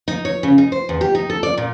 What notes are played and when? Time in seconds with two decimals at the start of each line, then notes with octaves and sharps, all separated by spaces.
0.08 D#4
0.25 C#5
0.43 C#3
0.58 D#4
0.72 C5
0.89 E2
1.01 G4
1.15 D#4
1.30 A4
1.43 D5
1.57 A#2